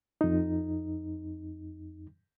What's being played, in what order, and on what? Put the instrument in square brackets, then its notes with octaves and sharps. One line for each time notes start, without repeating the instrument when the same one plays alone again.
[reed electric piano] F2 D#4